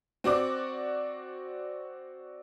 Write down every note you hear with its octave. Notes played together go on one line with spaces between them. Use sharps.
C4 F#4 D5 D6